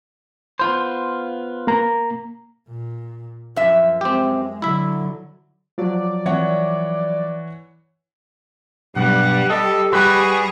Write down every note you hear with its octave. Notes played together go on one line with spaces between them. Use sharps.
B3 F4 C5
A#3 A#5
A#2
F#2 F3 E5
G#3 C4 G4
D3 F#3 E4 E5
F3 F#3 D5
E3 C#5 F#5
B1 G2 G3 F#5
G4 A4 D#5
G3 F#4 G#4 B4